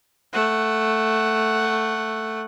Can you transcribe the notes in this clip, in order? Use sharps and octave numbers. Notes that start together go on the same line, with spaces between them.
A3 F#5